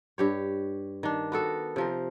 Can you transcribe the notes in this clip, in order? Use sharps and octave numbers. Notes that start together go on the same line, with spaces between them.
G2 G4 C#5
D#3 D4
B3 F#4 A4
C3 F3 A#4